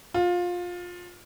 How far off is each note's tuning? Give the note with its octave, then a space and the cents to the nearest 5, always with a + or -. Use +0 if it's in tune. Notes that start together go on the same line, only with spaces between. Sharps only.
F4 +20